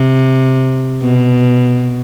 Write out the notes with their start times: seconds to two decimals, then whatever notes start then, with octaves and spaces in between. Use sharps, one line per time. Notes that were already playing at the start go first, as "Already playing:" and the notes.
Already playing: C3
1.02 B2